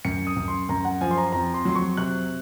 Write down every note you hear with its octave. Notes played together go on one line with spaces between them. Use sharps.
F#2 C#7
D#6
F#2
C6
F#2 A#5
F#5
F3 G#5
C6
A#5
F2 A#5
C6
F#3 C6
C#6
C3 F#6